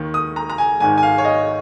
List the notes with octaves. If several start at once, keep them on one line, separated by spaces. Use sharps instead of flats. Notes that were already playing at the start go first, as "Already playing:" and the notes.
Already playing: D#2 D#3
D#6
A#5
A#5
G#5
G#1 G#2 D#3 G#5
G#5
F5
C#5
D#5